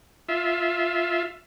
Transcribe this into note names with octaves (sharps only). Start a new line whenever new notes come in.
F4 E5